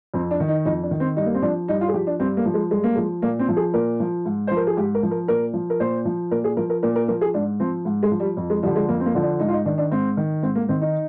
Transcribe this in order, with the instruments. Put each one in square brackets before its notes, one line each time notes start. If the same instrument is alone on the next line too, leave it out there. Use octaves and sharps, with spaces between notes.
[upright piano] F2 C4
D4
D#3
D#4
F2 D#4
D4
D#3
C4
G2 D#4
A#3
C4
F3 D4
G2 D#4
F4
G#4
F3 G4
D4
G2 C4
A#3
F3
G#3
G2 G#3
A#3
F3 G#3
A#2 A#3
C4
F3
G#4
A#2 A#4
F3
G#2
F3 C5
A#4
G#4
G#2 G4
A#4
F3
A#4
A#2 A#4
F3
A#4
A#2 C5
F3
A#2 A#4
G#4
F3 A#4
A#4
A#2 A#4
A#4
F3 A#4
G#4
G#2 D4
F3 C4
G#2
G#3
F3
G3
F2
G#3
D3 F3 G3
G#3
F2 A#3
C4
A#3
D3 F3
D4
G#2 D#4
F4
D#4
D#3 D4
D4
G#2 C4
D#3
G#2 C4
A#3
D#3 C4
D#4